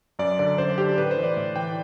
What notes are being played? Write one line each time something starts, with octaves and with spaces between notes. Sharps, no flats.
F#2 D5
D3 D5
F#2 C5
D3 G4
A2 B4
C5
E3
D5
A2
E3 G5